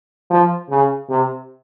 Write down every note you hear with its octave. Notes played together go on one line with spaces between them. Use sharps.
F3
C#3
C3